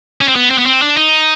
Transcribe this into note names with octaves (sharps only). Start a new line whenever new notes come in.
C#4
C4
B3
C4
B3
C4
D4
D#4